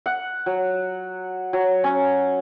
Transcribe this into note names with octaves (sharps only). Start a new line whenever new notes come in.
F#5
F#3
F#3
C#4